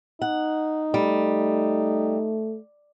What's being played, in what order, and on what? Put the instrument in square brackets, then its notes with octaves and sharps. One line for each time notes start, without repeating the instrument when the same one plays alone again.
[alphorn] D#4 [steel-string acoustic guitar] F#5
[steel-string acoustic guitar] G3 [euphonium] A3